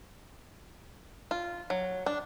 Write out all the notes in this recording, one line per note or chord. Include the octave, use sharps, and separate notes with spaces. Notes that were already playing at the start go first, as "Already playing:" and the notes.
F4
F#3
D4